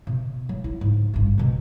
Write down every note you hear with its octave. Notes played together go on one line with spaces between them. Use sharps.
B2
F#3
E4
G#2
A1 G2
E2 B2